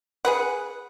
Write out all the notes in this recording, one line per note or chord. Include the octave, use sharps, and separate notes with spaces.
G#4 B4 F#5